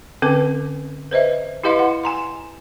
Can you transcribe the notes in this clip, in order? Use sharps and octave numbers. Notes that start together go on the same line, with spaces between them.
D3 C4 C#4 B4 D6
B4 C5 D#5 E5
E4 G4 B4 D#5 F5 C6
F#5
G#5 A#5 C6